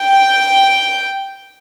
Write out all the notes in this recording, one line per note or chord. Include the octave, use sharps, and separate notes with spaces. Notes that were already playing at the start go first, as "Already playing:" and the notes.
Already playing: G5